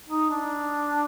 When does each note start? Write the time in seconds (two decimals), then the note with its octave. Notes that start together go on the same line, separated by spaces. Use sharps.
0.08 D#4
0.30 D4